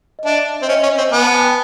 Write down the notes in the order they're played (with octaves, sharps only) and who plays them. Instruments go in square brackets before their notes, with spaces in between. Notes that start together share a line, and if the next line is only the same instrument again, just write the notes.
[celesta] D#5
[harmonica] D4 [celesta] E5
[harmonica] C4 [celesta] D#5
[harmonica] C#4 [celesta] E5
[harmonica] C#4
C4
[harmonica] B3 [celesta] G#5
[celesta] A5
G#5
G5